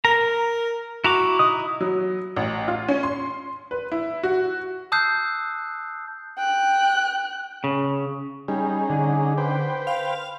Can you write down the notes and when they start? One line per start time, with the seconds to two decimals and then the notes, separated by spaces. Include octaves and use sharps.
0.05 A#4 A#5
1.04 E4 F#4 A#5 D6
1.39 D#4 D#6
1.81 F#3
2.36 A1
2.68 F4
2.88 C#4
3.03 C6
3.71 B4
3.92 E4
4.23 F#4
4.92 A5 D#6 E6 F#6 G6 C7
6.38 G5 F#6
7.64 C#3
8.48 G3 C#4 D#4 G#4
8.89 D3
9.38 B4 C5 G5
9.87 F5